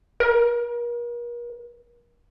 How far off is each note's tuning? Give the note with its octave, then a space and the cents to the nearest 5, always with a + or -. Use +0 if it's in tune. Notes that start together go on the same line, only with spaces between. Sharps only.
A#4 +40